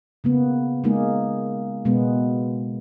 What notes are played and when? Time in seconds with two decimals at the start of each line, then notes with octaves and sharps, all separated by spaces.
0.24 C#3 A#3 B3
0.84 G#3 A#3 D#4 G#4
1.85 B2 G#3 B3